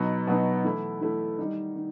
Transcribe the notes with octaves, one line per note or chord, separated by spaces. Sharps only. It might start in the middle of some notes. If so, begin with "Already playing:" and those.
Already playing: B2 F#3 B3 D#4
B2 F#3 B3 D#4
E3 A3 E4
E3 A3 E4
D#3 G3 D#4
D#3